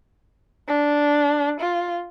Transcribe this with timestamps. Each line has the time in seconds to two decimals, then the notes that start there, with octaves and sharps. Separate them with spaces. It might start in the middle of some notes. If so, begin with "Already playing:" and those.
0.68 D4
1.61 F4